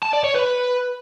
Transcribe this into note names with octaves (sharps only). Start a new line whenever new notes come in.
A5
D5
C#5
B4